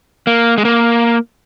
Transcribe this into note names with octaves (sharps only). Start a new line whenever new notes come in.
A#3
G#3
A#3